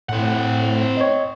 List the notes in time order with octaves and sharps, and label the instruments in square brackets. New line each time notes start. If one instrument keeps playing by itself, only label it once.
[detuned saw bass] A2 [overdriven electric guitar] C4 F#5
[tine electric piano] C#5 D#5